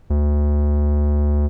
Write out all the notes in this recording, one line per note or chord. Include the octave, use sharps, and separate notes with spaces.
D2